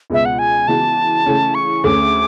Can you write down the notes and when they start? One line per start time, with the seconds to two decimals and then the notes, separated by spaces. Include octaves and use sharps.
0.10 C#2 B2 G#3 B3 E5
0.25 F#5
0.39 G#5
0.68 C#3 E3 G#3 B3 F#4 A5
1.26 C#3 E3 A3 C#4
1.55 C#6
1.84 D2 D3 A3 C#4 G#4 D6